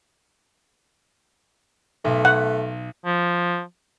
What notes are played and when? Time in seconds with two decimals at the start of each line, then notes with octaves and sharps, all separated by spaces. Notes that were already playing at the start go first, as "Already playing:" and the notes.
2.05 B1 A3
2.25 F#5
3.05 F3